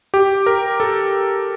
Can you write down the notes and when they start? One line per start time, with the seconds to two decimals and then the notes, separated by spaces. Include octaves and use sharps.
0.14 G4
0.46 A#4
0.80 A4